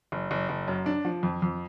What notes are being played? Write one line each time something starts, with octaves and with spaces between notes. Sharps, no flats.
F#1
F#1
F#1
F#2
D4
F3
F2
F2